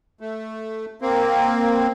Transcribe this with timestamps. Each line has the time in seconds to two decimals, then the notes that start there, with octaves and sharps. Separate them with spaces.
0.20 A3
1.02 A#3 C4